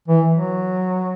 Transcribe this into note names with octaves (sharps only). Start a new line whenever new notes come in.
E3
F#3